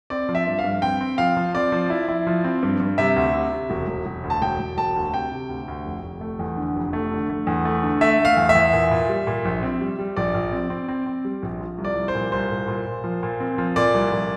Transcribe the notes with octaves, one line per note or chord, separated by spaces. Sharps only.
C4 D5
F3
E5
G2
F5
G2
C4 G5
C4
F3 F5
F3
C4 D5
F3
E4
E4
F3
C4
G2
G2
C3 E5
D2
C3
C3
E1
E1
E1
D2
A5
E1 G5
E1
E1 A5
D2
C3 G5
C3
D2
D2
F1
F1
A3
E2
D3
F1
A3
D3
A3
E2
A3
D3
A3 E5
A3
F5
E2
E5
E2
A#2
A#2
G3
A#2
A#1
C4
G3
G3
A#1 D5
A#1
C4
C4
C4
C4
G3
A#1
F3
C2
D5
C2
C5
A#2
C2 C5
A#2
A#2
A#2
F3
A#2
C4
F3
A#2 D5
C2
A#2